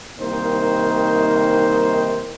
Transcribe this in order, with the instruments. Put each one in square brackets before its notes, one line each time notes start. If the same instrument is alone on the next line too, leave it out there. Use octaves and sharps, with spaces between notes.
[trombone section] C2 D#3 A#3 D#4 A#4 C5